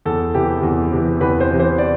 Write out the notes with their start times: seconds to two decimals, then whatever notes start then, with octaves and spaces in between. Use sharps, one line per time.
0.05 E2 A4
0.34 C3 E3 G4
0.63 E2
0.92 C3 E3
1.21 E2 B4
1.40 C5
1.51 C3 E3
1.60 C5
1.78 D5